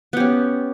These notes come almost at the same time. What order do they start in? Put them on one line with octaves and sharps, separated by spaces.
B3 G4 C#4